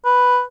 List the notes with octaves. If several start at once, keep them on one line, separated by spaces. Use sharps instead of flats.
B4